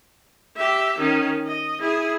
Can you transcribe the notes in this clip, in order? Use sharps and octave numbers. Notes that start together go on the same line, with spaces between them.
G4 E5
D#3 C#4
D#5
E4 G#4